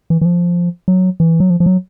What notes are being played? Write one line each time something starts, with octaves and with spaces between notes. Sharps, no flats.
E3
E3
F3
F#3
E3
F#3
F3
F3
F#3